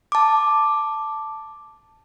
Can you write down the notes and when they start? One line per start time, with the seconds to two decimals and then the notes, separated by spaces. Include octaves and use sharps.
0.12 A5 D6